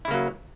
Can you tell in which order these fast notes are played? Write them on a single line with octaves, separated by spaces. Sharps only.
E4 C#3 A#3 F#3